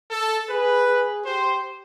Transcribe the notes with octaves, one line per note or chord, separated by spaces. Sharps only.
A4
G#4 B4
G#4
G4 C5